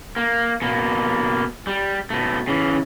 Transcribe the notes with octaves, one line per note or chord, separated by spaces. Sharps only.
A#3
B2 A#3
G3
B2 A3
C#3 E3